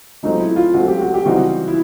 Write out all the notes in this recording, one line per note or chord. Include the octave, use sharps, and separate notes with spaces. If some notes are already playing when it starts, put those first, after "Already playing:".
C#2 C#3 F#3 A3 C4 D#4
E4
F4
C#2 C#3 F#3 A3 C4 F#4
G4
F#4
G4
C#3 E3 G3 C4 D#4 F#4
E4